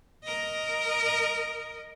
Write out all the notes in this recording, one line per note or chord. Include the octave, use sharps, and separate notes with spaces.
A#4 D#5